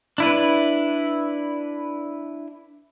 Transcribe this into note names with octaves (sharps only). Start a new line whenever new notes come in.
D4 E4 B4